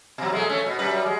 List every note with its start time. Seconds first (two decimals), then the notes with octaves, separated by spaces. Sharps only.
0.18 B2 F#3
0.32 G#3 A3
0.50 A3 C#4
0.66 B2
0.79 F#2 G3 B4
1.06 G#3